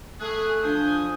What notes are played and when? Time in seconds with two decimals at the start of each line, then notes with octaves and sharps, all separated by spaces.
0.20 A3 G#4 F#6
0.63 F3 D4 G#5 D#6 G6